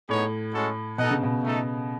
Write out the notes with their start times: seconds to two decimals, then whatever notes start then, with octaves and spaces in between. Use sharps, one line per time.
0.08 A2 B3 D#4 G#4 C#5
0.53 G#3 C#4 F#4 A4
0.98 B2 D#4 A4 D#5 F#5
1.11 C#3
1.23 B2
1.44 A3 D#4 A4